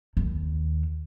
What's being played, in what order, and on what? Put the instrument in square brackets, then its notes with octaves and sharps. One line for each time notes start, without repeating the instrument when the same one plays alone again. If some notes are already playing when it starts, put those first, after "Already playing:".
[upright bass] D#2